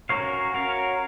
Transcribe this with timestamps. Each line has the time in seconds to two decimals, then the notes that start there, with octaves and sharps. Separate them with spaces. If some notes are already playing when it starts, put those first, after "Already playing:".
0.09 C#4 F#4 A#4 C#5 F5
0.54 C#4 F#4 A#4 C#5 F5